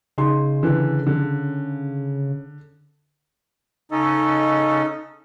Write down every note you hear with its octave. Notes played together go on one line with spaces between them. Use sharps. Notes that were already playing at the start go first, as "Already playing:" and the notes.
C#3 D#4 G#4 C6
D3 E3
D3
C#3 C#4 D#4 A4 D#5